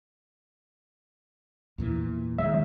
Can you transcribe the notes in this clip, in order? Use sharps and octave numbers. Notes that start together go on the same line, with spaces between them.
E2 A#2 E3
D#3 E3 G#3 E5